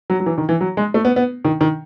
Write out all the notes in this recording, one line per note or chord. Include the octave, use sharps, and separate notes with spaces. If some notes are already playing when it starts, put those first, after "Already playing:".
F#3
F#3
E3
D#3
E3
F#3
G#3
A3
B3
B3
D#3
D#3